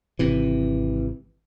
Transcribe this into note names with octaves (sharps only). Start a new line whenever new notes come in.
G#1 C3 E3